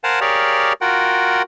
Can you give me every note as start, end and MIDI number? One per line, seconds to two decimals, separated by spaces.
0.04 0.20 70
0.04 0.20 72
0.04 0.20 77
0.04 0.20 78
0.04 0.20 80
0.04 0.20 81
0.21 0.73 67
0.21 0.73 68
0.21 0.73 70
0.21 0.73 73
0.21 0.73 74
0.21 0.73 77
0.81 1.42 65
0.81 1.42 66
0.81 1.42 70
0.81 1.42 78
0.81 1.42 79